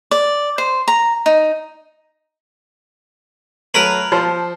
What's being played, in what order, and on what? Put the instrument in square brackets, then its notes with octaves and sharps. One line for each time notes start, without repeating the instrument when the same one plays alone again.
[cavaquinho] D5
C5
A#5
D#4
[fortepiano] F#3 A3 [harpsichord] A#4 B4
[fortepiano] F3 C5 A5